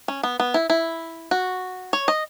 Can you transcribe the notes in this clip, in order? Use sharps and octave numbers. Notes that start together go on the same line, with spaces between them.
C#4
B3
B3
E4
E4
F#4
C#5
D#5